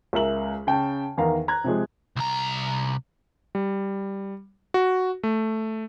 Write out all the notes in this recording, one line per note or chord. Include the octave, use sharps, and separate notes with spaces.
C#2 A#4 E5 F#7
C#3 G5 A5
E2 D#3 F5 A#5
A#5 F#6 G#6
C3 F3 G#3
C2 A#5
G3
F#4
A3